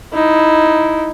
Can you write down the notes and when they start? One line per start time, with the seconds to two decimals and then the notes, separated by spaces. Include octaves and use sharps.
0.13 D#4 E4